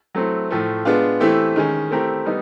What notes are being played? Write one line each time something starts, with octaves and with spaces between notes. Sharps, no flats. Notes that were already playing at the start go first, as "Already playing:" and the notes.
F#3 A3 C4 E4
A2 F3 A3
G#3 B3 D4 F4
E3 A3 C4 E4 G4
D#3 G#3 C#4
A3 C4 E4 G4 A#4
G3 B3 D#4